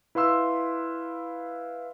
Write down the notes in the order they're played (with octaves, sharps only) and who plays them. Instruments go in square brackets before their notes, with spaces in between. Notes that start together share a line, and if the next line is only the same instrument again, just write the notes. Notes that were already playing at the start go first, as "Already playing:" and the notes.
[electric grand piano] E4 B4 F5 C6 E6